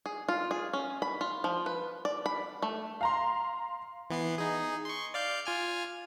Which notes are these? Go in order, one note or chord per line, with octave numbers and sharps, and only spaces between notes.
G#4
F4
G#4
C#4
B5
F4
F3
B4
D5
B5
A3
F5 A#5 C6
E3 B3 C7
D#4 G#4
C6 C#6
D5 F5 G6
F4 G#5 F6